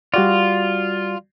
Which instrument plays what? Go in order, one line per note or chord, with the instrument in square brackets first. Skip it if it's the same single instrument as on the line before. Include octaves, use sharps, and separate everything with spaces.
[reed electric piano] G3 F#4 D5 [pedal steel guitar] F4